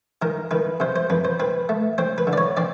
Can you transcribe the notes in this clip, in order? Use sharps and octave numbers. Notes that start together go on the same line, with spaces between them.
D#3 A#4
D#3 B4
C3 C5
C5
F2 B4
C5
C4 B4
A3
C4 C5
B4
D3
D5
C#5
C4 D5